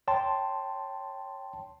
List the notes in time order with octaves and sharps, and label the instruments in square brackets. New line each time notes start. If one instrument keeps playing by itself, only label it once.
[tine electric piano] C#5 G5 A5 C6